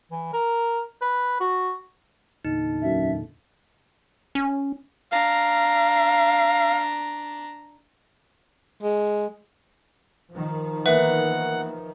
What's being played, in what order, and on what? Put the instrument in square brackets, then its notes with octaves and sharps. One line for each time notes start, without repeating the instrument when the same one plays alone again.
[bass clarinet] E3
A#4
B4
F#4
[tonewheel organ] E2 A#2 D3 [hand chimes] D#4
[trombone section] F#2 [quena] E5
[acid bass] C#4
[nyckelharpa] D4 A#5 [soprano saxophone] F5
[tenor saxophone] G#3
[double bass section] D#3 F3
[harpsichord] E3 A#3 B3 [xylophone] B4 E5 [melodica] F#5